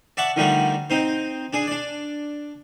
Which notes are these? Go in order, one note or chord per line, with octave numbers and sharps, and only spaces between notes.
D5 E5 F#5 A5 C#6 D6
D3 D#3 F3 G3 A3 F#4
C4 D#4 C5
D4 G#4
D4 D5